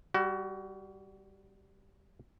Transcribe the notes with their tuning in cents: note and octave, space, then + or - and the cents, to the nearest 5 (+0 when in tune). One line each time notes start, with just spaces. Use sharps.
G3 +0 F#4 +25